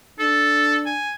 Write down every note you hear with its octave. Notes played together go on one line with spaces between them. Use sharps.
D4 A4
G#5